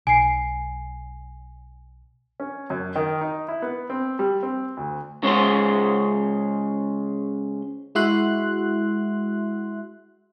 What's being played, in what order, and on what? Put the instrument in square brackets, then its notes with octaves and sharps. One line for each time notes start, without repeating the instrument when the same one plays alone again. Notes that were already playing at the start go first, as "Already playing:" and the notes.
[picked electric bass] B1 [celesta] G#5 C7
[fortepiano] C#4
F#2
D#3
D#4
E4
B3
C4
G3
C4
D2
[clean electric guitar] C#3 G#3 C#4 C5
[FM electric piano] G#3 E4 F#4 E5 C6 F#6